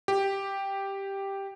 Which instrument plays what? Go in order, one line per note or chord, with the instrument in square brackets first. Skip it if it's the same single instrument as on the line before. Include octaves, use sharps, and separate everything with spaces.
[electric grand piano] G4